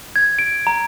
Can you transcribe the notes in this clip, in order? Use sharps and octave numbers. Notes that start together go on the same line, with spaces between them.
G#6
D7
A#5